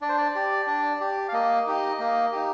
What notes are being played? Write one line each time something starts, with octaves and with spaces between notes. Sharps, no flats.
D4 D5
C5
D5
G4
D4
G4
F5
A#3 D#5
D#4 G4
A#3
D#4 G4